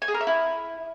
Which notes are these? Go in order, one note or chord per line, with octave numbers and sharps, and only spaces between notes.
G#5
G#4
A#4
E5
E4